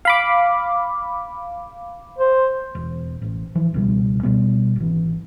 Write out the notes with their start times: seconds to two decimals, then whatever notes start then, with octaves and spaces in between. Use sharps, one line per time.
0.05 F5 B5 D6
2.18 C5
2.75 E1
3.22 A1
3.55 E3 F3
3.73 D#1 C#2 B2 G3
4.23 B2 G3 B3
4.76 G#1 E3